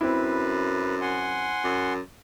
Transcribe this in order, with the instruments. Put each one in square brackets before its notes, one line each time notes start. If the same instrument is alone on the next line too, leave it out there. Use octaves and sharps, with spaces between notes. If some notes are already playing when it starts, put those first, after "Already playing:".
[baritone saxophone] F#2 [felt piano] C4 E4 [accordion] B4
[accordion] F#5 G#5 C6
[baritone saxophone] F#2